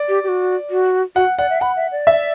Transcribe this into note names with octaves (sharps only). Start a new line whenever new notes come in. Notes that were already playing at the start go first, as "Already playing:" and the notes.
Already playing: D5
G4
G4
F#4
F#4
F#4 F#5
D5 F#5
E5
F#5 B5
E5
D5
E5